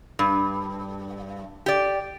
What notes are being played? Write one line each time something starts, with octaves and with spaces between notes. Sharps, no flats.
G2
G4 D5